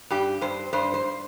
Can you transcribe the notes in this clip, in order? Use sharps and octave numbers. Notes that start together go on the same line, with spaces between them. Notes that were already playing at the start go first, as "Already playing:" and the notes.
G2 G4
G2 C5
G2 C5
C5